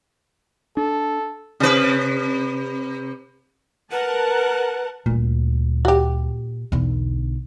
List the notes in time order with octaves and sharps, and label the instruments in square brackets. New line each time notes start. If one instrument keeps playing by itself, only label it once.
[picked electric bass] D4 [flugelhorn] A4
[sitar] C3 B4
[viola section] A#4 F#5 A5 [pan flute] B4
[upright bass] D2 G3 [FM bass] A#2
[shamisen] F#4 G4
[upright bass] B1 D3 [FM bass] E2